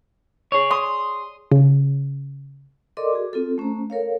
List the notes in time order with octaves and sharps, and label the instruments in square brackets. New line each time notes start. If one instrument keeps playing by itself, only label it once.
[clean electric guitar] G#4 C#5
[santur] C6 D#6
[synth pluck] C#3
[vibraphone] A4 A#4 D5 D#5 C6 D6
F#4 G#4
C4 F4 A4
A3 C#4 C5 A#5
A4 A#4 C#5 F5